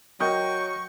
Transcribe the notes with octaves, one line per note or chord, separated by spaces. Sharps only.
F#3 F#4 A#4 D#5 G5 C#6